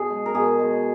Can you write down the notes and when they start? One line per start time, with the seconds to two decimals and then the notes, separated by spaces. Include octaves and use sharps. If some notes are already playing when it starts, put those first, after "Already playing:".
Already playing: B2 G#4
0.10 G#3
0.26 A#4
0.35 B2 G#4
0.59 G#3